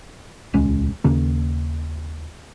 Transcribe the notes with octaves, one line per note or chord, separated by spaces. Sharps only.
D#1 C#2 G#3 C#4
D#2 C#3 A#3